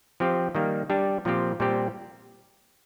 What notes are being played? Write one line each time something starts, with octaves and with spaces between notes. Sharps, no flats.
F3 C4 G4
D#3 G3 A#3
G3 D4 G4
A#2 F3 C4 G4
A#2 G3 C4 G4